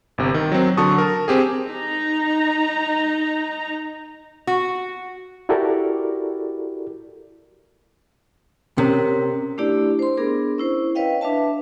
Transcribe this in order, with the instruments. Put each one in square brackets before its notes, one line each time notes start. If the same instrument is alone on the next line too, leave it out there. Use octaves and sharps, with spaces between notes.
[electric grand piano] G1 C3
D#3
F#3 C4
D3 F#3 A5 C#6 D#6
A#4 A5
C4 G4 G#4
[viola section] D#4 A#5
[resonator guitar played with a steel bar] F#4
[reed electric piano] E4 F#4 G4 A4 A#4 D5
[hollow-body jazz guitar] C3 [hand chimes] C#4 A#4
[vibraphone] A3 D4 E4 G4 D5
C5 C6
B3 D4 G#4 A#4
C#4 E4 C5
B4 C#5 D#5 F5 G5
D4 B4 E5 A5